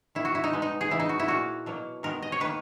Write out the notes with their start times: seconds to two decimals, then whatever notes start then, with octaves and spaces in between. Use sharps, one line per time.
0.15 D#3 A#3 E4
0.25 F#4
0.35 E4
0.44 D#4
0.53 B2 G#3 B3
0.62 D#4
0.81 G#4
0.91 C#3 E3 B3 E4
1.00 D#4
1.09 F#4
1.19 E4
1.28 A#2 A#3 F#4
1.66 B2 F#3 A#3
2.03 D#3 G#3 B3 A#4
2.22 D#5
2.32 C#5
2.40 D#3 A#3 B4